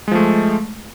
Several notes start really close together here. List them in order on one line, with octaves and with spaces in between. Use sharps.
G#3 F3 A3